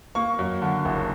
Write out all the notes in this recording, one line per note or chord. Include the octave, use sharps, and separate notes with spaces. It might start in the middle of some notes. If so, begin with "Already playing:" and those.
A#3 C#6
F#2
D3
F#1